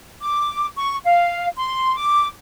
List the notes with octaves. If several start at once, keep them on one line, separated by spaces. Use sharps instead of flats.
D6
C#6
F5
C6
D6